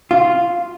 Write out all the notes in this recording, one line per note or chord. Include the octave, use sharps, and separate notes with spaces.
F4